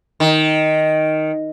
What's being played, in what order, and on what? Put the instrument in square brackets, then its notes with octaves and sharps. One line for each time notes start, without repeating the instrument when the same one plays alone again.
[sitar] D#3